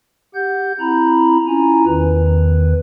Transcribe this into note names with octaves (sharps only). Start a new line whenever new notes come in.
G4 F#5 G6
C4 E4 A#5 B5
C#4 E4 F4 G#5 A#5
E2 D#3 B4